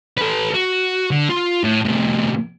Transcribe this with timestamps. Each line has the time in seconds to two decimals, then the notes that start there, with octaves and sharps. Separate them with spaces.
0.17 A4 B4
0.54 F#4
1.12 D3
1.29 F4
1.63 A2
1.84 A2 C3